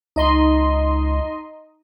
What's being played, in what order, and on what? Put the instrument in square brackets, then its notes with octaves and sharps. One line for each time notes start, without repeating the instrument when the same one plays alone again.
[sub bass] C#2 [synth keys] D#4 D#5 C6